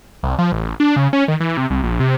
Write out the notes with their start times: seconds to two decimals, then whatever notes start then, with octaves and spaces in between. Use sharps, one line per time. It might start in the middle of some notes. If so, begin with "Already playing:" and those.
0.23 C2
0.39 F3
0.52 A1
0.80 D4
0.96 C#3
1.13 C#4
1.28 D#3
1.40 E3
1.57 C3
1.70 C2
1.83 A#1
2.00 C3